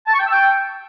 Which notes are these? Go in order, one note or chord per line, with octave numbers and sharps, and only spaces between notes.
A5
C#6
G5
E6
G5